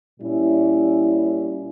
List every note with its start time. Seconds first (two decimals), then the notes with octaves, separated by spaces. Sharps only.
0.20 A#2 G3 C#4 E4